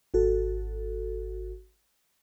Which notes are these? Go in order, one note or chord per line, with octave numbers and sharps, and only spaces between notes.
G#1 F#4 A4